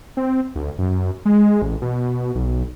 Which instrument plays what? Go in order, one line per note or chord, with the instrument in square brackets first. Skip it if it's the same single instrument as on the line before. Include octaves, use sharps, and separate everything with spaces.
[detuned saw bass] C4
D2
F#2
G#3
A1
B2
B1